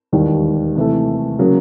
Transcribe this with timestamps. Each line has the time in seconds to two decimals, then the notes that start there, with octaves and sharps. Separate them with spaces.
0.12 E1 D#2 D#3 G3
0.75 C3 E3 A3
1.39 C#3 F#3 A#3